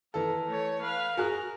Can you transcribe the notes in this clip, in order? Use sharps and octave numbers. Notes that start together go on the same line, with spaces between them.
E3 A4 A#4
A3 C#5
B4 F5
F#4 G#4 A#4 F#6